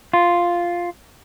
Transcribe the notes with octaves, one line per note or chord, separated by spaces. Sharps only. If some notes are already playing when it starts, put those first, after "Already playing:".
F4